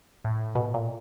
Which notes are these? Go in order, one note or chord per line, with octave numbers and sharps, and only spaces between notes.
A2
B2
A#2